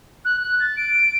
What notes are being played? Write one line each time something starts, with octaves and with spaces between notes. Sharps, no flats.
F#6
F#6
A6
D7